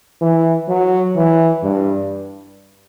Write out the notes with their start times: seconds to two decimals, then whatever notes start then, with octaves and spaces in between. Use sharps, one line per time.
0.21 E3
0.68 F#3
1.16 E3
1.63 G2